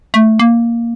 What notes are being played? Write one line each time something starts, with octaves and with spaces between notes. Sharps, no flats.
A3
A#3